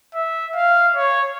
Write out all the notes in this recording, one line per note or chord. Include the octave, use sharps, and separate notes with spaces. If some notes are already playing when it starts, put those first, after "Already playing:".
E5
F5
C#5